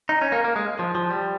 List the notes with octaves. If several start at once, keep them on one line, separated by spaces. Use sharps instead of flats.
D#4
C#4
A#3
A#3
G#3
F3
F3
G3